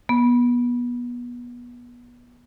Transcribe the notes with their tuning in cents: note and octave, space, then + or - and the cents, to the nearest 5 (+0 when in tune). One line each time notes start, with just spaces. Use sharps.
B3 -25